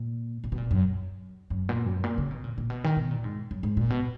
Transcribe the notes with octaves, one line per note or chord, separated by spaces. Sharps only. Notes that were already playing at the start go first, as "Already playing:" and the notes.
Already playing: A#2
A#2
B2
A#2
F#2
F#2
A#2
F#2
A#2
C#3
B2
A#2
A#2
B2
D#3
B2
A#2
G#2
F#2
G#2
A#2
B2